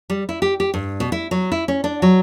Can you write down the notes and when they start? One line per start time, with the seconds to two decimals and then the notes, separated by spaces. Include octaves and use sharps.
0.10 G3
0.29 E4
0.42 G4
0.60 G4
0.74 G2
1.00 B2
1.12 E4
1.31 F#3
1.52 E4
1.68 C#4
1.84 D4
2.02 F#3